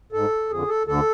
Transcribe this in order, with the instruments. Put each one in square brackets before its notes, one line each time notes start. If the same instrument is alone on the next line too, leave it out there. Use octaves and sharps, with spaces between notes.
[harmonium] G#2 A4
F2 D3 G#4
A4
D2 D3 A4